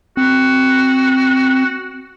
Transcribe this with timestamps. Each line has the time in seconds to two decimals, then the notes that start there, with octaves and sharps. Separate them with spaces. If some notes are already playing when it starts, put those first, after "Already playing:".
0.17 C4 F#4